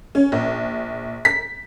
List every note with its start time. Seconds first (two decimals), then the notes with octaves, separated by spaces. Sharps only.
0.15 C#4
0.32 A#1
1.25 B6